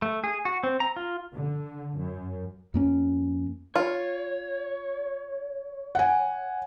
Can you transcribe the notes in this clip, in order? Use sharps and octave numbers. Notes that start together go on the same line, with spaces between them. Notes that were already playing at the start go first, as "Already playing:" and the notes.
A3
G#4
F#4
C4
A#5
F4
D3
F#2
F2 A#3 C#4
F4 C#5
F#5 G#5